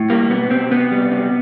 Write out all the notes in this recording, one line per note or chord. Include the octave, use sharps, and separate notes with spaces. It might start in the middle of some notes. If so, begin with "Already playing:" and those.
Already playing: A2
G3 A#3
B2 B3
B2 C4
C3 B3
G3
C3